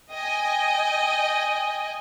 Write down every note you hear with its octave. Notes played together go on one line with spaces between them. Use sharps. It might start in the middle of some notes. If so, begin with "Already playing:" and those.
D#5 G5 G#5